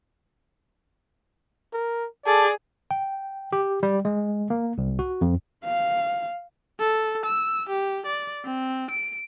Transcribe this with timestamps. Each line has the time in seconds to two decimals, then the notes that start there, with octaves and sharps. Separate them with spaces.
1.73 A#4
2.26 G#4 A4 D5 A5
2.91 G5
3.53 G4
3.83 G3
4.05 G#3
4.50 A#3
4.78 C2
4.99 F#4
5.21 F2
5.64 F5
6.80 A4
7.26 E6
7.69 G4
8.06 D5
8.45 C4
8.91 D7